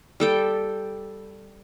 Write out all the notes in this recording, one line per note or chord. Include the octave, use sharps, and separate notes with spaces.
G3 A4 G5